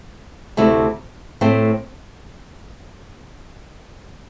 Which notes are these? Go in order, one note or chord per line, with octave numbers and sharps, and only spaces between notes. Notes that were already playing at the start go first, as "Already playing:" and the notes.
D2 C3 A3 E4
A2 A3 C4